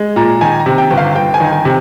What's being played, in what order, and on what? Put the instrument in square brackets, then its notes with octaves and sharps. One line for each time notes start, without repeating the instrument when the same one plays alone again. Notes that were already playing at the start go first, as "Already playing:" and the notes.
Already playing: [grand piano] G#3
[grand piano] A#2 [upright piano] A#5
[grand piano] D#3 [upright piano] G#5
[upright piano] A#5
[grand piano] C3
[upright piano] G5
[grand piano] G1
[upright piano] F5
[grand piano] G1 [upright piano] G5
[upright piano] G#5
[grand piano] D#3
[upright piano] G#5
[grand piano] C3